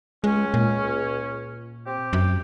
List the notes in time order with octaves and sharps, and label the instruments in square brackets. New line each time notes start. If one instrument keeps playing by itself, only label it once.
[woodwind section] C#2 C#4 [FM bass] G#3
[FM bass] A#2
[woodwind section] C4 G4
[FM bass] F#2